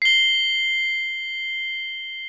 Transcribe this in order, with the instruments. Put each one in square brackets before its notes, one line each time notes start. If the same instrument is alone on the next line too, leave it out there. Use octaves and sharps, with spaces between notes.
[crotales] C7 G7